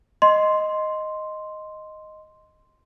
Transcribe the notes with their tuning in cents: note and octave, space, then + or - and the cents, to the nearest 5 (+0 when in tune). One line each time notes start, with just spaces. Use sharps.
D#5 +0 C6 +0